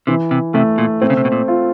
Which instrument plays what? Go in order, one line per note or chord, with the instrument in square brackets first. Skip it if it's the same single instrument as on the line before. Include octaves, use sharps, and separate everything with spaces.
[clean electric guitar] C3 [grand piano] E3
[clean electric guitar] C3
[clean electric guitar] C3 [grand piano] A3
[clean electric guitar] A#2
[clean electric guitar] A2 [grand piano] C4
[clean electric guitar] C#3
C3
B2
A#2
[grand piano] F4